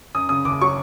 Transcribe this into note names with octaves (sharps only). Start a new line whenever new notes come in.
F#2 D#6
C#3 D#6
F#1 D6
F#3 C#6